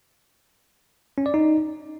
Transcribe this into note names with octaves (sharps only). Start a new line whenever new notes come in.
C#4
D5
D#4